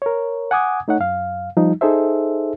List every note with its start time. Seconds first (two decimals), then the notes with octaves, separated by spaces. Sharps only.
0.02 A#4 C#5
0.51 F#5 G#5 D6 D#6 G#6
0.88 A3 D#4 C#5 F#5
1.00 F#2 F5
1.57 F3 G3 D#4
1.81 D#4 G#4 A4 C5 E5